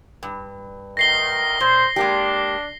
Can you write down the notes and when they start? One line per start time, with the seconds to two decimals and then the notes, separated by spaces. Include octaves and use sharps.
0.23 G2
0.97 D2 D#3 A#6 C7 G7
1.60 A#2 C5
1.96 G#3 A#3 D4 G4